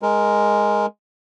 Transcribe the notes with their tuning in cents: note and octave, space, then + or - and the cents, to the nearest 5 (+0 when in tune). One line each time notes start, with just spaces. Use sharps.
G#3 +0 A#4 +5